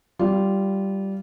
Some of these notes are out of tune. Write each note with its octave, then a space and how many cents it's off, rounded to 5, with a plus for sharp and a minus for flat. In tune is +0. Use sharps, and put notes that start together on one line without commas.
G3 -10 F4 -15